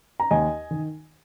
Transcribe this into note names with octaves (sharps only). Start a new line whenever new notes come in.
A#5
D#2 D#5 G#5
D#3